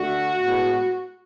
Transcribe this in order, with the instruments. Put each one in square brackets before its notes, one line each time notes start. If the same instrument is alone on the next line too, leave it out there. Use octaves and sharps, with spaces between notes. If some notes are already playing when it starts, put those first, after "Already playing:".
Already playing: [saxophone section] D3 A3 F#4
A2 G#3 B3